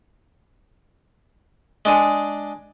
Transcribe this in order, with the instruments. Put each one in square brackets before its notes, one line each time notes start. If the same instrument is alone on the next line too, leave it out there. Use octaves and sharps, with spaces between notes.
[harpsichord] G#3 D4 G#4